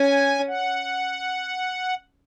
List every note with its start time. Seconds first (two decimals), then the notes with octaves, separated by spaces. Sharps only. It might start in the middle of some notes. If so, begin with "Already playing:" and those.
Already playing: C#4 G#5
0.47 F#5